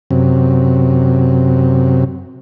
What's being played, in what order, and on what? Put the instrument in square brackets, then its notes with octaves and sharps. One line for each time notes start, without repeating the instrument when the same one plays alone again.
[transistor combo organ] F#2 C3